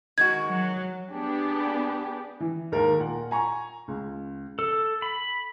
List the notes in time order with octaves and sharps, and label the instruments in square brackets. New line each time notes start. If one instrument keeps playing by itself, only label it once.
[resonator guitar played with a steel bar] D#3 G#3 F#4 [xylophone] G#6
[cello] F#3
[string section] B3 D4 G4 G#4
[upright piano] E3
D#2 G#2 A#4
A#2 F#5
G#5 A#5 C#6
C#2
[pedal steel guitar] A4
B5